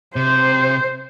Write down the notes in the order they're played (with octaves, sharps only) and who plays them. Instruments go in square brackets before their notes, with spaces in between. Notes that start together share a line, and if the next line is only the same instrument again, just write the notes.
[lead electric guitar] C3 [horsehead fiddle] C5